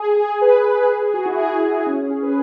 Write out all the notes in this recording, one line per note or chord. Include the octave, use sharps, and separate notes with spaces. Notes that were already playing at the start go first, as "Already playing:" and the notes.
Already playing: G#4
G#4
B4
B4
G#4
G#4
F#4
E4
G#4
C#4
C#4
G#4
B4